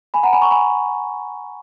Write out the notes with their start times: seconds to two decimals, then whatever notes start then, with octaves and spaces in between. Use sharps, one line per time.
0.14 G#5 B5
0.23 F#5 A#5
0.33 G#5 B5
0.42 A#5 C#6
0.51 G#5 B5